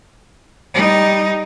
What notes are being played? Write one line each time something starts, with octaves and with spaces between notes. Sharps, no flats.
G3 D#4